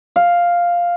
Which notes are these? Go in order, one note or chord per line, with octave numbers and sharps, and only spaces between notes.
F5